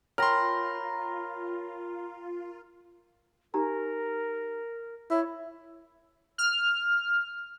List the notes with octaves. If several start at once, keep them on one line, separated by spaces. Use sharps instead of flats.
F4 A#4 C#5 G5 B5 C6 F6 A#6
D#4 G4 A#4 A#5
E4 C#5
F6